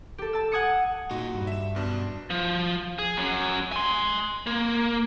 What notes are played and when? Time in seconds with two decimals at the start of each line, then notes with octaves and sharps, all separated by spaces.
0.18 G4 A4
0.33 A5 E6
0.52 F#5 G#5 D#6 C#7
1.11 A#2 D#4 F#4
1.34 G2
1.47 E5 E7
1.75 F#2 B2 D4
2.30 F3
2.99 G#4
3.17 F#3 C#4
3.72 G#5 C6
4.47 A#3